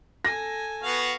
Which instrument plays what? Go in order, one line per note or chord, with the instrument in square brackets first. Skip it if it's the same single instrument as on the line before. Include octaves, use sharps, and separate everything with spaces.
[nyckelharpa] A4 G#5 [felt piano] A#6
[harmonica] B3 F#4 F5